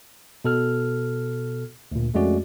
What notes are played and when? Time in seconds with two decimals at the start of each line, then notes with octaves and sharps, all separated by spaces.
0.45 B2 A4 F6
1.92 D2 A#2
2.14 F2 G#3 A3 C#4 F#4 D5